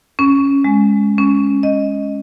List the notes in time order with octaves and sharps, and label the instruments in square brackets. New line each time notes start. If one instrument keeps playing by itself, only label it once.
[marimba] C#4
G#3
C#4
D#5